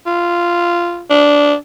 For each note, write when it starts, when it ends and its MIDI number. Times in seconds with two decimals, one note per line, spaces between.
0.06 1.03 65
1.10 1.54 62